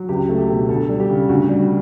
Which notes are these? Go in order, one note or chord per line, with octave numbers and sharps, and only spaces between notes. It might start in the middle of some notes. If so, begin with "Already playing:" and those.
Already playing: F#3
C#2 G4
A3
G4
B2
D2 A4
G3
G4
C#3
D2 F#4
G3